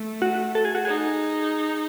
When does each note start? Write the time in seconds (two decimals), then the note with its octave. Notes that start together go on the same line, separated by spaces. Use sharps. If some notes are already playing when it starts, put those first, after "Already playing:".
Already playing: A3
0.22 F#4
0.55 A4
0.65 G#4
0.75 F#4
0.85 D#4 G#4